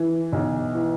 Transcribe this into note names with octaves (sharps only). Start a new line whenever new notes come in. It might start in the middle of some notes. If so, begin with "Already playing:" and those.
Already playing: E3
B1
E3